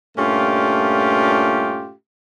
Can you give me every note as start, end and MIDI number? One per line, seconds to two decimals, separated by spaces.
0.17 1.93 43
0.17 1.93 46
0.17 1.93 57
0.17 1.93 61
0.17 1.93 65
0.17 1.93 67